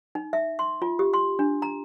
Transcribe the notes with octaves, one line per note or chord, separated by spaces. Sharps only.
D#4
E5
C6
F4
G4
C6
D4
A#5